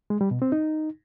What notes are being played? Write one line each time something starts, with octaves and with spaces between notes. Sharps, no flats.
G#3
G3
B2
C4
D#4